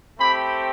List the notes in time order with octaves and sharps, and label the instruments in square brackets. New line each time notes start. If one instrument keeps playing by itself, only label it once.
[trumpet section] A3 C4 G4 B5